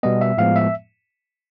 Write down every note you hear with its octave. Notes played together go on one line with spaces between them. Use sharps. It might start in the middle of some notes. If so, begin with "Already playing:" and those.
B2 G3 B3 D#5
E5
A2 F3 G#3 B3 F5
E5